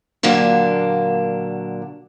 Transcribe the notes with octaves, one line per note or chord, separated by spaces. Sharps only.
A#2 D3 F#3 A#3 D4